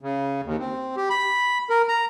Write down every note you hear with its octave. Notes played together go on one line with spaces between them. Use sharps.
C#3
D#2
C4
G4
B5
A#4
A#5